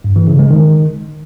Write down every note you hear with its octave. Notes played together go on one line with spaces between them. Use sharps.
G2
E3
C#3
G#3
D#3